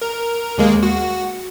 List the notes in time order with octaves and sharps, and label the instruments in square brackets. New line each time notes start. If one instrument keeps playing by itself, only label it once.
[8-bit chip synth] A#4
D#2 G#3 A#3
F#4